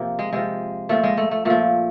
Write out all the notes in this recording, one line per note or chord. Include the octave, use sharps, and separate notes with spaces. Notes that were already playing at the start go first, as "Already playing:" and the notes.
Already playing: C3 F3 A#3
G#3
C3 F3 G#3
A#2 F3 A3
G#3
A3
A3
A#2 F3 A3